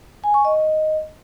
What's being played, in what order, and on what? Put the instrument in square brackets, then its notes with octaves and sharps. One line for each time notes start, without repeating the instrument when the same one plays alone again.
[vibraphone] G#5
C#6
D#5